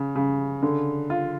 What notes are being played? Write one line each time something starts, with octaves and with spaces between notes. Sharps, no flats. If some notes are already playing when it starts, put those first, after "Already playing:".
Already playing: C#3
C#3
D3
F4